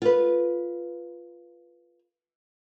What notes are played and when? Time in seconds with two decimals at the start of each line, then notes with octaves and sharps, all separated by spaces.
0.02 F4 B4